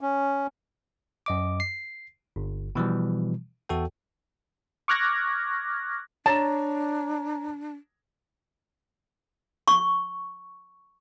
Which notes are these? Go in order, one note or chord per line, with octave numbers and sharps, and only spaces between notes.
C#4
F#2 D#5 D6
C7
G1
B2 E3 F3 G3
E2 F#4 A4 G5
C#6 D6 F6 F#6 G#6 A#6
D4 C#5 A5 A#5
C#6